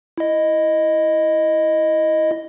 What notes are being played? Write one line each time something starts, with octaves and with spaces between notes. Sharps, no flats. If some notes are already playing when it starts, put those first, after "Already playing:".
E4 D#5